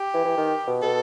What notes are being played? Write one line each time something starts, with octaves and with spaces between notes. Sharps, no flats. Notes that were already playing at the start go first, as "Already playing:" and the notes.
Already playing: G4
E3
E3
D#3
B2
B2 A4